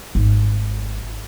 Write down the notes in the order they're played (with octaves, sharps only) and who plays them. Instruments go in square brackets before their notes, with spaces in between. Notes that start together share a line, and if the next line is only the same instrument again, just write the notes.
[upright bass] G#1